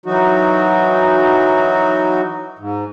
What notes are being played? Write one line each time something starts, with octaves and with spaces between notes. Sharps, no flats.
E3 F#3 D#4 F#4
G#2